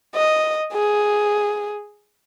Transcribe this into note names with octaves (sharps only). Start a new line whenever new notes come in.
D#5
G#4